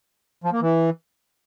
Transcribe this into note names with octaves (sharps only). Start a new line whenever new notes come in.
F3
A#3
E3